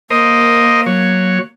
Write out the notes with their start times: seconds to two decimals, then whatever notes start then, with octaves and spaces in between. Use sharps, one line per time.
0.10 A#3 A#4 C5 D#5
0.86 F#3 C#5